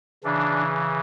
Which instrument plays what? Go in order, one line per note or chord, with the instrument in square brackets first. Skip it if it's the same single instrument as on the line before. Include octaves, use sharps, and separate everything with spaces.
[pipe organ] C#3 E3 D4